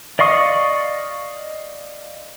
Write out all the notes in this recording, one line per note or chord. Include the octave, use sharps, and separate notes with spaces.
D5 D#5 F5 C#6 D#6